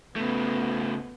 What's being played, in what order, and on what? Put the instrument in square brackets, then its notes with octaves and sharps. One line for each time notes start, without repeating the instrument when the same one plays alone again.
[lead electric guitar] C#3 A3 [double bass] B3